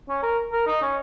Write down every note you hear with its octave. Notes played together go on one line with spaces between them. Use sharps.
C#4
A#4
A#4
D#4
C#4